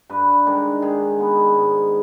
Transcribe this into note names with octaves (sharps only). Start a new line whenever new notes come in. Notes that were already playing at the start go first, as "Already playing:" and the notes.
G2 B4
D#3 G#3 D4
D#3 G#4
G#3 B3
G#2